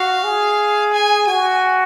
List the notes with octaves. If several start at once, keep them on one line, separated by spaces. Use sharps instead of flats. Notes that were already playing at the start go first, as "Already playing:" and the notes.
Already playing: F#4 F5
G#4
G#5
F#4 G#5